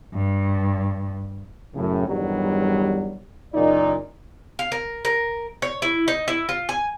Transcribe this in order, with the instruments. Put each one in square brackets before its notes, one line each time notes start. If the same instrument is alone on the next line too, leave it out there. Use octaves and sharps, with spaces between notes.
[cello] G2
[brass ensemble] F#2 A2 C#3
E2 G2 D#3 F#3 G3
F#1 A#2 D#4 D5
[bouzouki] F5
A#4
A#4
C#5
E4
D#4
E4
F4
G#5